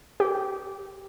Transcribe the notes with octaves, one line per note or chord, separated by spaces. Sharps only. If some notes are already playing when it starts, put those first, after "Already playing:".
G4